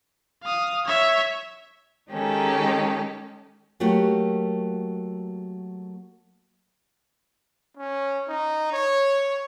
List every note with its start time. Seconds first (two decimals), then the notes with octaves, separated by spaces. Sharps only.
0.43 F5 D#6
0.86 C#5 E5
2.12 D#3 G#3 C#4 D#4 G4 A4
3.80 F#3 A3 A#3 F#4 G4
7.77 C#4
8.29 D#4
8.73 C#5